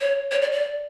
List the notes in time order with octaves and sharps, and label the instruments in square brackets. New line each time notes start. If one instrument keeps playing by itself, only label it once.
[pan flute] C#5
C#5
D5
D5